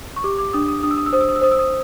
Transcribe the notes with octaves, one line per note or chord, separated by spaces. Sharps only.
C#6
G4 D6
D6
D4 D#6
D#6
D4 D#6
E6
D#6
E6
C5 D#6
E6
D#6
E6
C5 D#6
E6
D#6